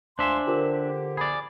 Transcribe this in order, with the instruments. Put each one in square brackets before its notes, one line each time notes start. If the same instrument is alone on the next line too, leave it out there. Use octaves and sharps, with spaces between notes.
[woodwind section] C#2 F5 C6 [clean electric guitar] D4 E5 [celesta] C5 G#5 E7
[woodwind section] D3 G4 [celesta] F4 A#4 C5
[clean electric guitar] G#4 D5 [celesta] B5